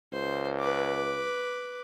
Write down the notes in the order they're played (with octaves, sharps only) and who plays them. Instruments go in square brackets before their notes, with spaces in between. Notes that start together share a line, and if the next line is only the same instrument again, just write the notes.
[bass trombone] C#2 [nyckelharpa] C5
[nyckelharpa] B4 D6